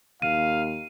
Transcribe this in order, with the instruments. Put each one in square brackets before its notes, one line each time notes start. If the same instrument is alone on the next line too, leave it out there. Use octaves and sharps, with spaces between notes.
[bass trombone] D#2 [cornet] F5 [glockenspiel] D#7